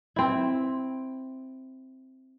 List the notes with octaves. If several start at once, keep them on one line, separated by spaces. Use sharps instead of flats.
C4 E4